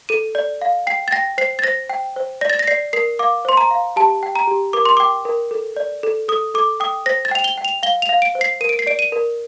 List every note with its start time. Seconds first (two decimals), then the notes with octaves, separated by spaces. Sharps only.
0.09 A4 D#7
0.35 D5
0.62 F5
0.87 G5 C7
1.08 A6
1.12 G5 A#6
1.38 C5 C7
1.59 A6
1.64 C5 A#6
1.90 G5
2.16 C5
2.41 D5 A#6
2.50 A6
2.59 A#6
2.67 D5 C7
2.93 A#4 C7
3.19 F5 D6
3.45 C5 C6
3.57 A#5
3.71 F5
3.96 G4 A5
4.23 G5
4.36 A#5
4.47 G4
4.73 A#4 D6
4.85 C6
4.97 G5 D6
5.25 A#4
5.51 A4
5.76 D5
6.03 A4
6.28 A4 D#6
6.54 A4 D6
6.80 G5 D#6
7.06 C5 A#6
7.25 A6
7.31 G5 F7
7.44 G7
7.58 G5
7.65 F7
7.83 F5 G7
8.02 F7
8.09 F5
8.22 D7
8.35 C5
8.41 C7
8.61 A#4 D#7
8.69 D7
8.79 C7
8.87 D5 D7
8.99 D#7
9.12 A#4